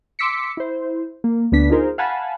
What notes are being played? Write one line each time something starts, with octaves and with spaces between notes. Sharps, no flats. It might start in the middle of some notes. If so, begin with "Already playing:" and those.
C6 D6 E6 B6 C#7
E4 C5
A#3
D2 B3 D4 B6
D#4 F4 G#4 A#4 C5
F5 F#5 G#5 A5 B5